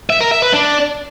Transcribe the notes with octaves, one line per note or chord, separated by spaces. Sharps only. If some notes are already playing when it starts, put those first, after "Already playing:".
E5
A#4
E5
B4
D4